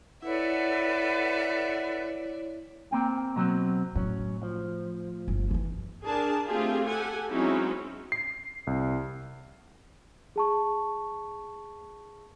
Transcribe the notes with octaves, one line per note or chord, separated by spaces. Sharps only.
E4 A4 B4 C#5 D5 E5 F#5
A#3 C4 G5
B2 F#3 C4
A2 F#3 C#4
F3
G1 A3
E3 C4
D4 G#4 A#4 A5
A3 C4 F4 G4 G#4
G4 A4 F#5 G#5
F#3 G#3 C4 C#4 D#4 E4
C7
C2
G#4 A5 C#6